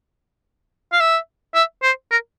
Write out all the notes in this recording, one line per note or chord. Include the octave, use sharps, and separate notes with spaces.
F5
E5
E5
C5
A#4